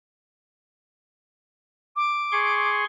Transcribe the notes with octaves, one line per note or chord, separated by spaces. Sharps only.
D6
G#4 C6 C#6